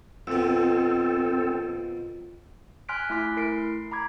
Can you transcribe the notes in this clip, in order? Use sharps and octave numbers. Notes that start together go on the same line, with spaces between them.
F2 B2 C4 A4
G#5 C6 F6 F#6 B6 D7
A3 E4 G#5 C6 D6 B6
A3 E4 A#4 C7 D7
A#5 B5 D6 G#6